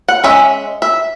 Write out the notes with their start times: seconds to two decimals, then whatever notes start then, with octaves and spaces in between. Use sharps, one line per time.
0.08 F#5
0.24 G#3 C#4 E5
0.82 E5